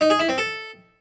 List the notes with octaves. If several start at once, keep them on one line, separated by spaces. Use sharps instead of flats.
D#4
G#4
E4
C4
A4